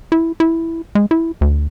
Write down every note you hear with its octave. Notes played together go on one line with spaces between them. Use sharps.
E4
E4
G#3
E4
D2